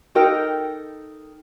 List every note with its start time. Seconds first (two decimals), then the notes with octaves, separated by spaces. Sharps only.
0.15 D#4 A4 A#4 G5